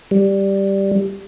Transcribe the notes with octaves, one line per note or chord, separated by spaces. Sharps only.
G3